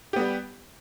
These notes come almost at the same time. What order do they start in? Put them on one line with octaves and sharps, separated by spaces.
G4 B3 G3